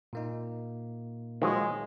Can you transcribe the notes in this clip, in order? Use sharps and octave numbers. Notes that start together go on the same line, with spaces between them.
A#2 A#3 D#4
D#3 F3 F#3 G#3